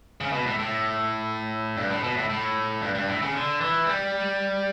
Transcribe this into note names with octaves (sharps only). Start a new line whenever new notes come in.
C#3
B2
A2
A2
G2
A2
B2
A2
A2
G2
G2
A2
C#3
D3
E3
G3